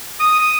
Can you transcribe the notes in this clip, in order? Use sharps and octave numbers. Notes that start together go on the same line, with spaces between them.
D#6